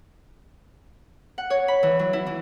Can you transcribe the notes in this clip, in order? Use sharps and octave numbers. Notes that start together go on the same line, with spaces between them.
F#5
C#5
B5
E3
F#3
E4
E3